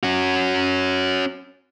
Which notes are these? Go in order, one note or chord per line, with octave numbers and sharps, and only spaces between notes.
C#4 F#4